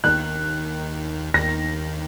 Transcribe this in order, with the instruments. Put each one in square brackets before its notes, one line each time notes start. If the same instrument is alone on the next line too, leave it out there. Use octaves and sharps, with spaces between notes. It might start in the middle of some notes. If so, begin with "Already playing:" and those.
[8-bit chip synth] D#2 D#3 [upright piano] F#6
[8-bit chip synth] D#2 D#3 [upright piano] A#6